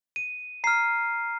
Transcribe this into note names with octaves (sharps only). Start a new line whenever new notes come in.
D#7
A#5 F6 C7